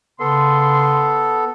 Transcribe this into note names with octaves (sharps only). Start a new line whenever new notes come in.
C#3 B3 A4 C6